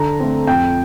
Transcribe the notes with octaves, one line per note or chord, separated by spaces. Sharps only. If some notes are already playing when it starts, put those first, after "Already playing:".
Already playing: D3 A#5
A3 C4
F2 G5